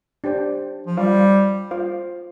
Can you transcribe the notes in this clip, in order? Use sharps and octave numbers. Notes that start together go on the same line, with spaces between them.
D4 G4 C5 G5
F3
G3 F4 C5 F5
F4 C5 F5